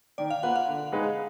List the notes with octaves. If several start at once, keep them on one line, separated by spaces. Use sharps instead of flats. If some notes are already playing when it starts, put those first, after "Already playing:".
D#3 D5
F5
A#3 F4 B4 F#5
F5
D3
G#3 D#4 G#4 B4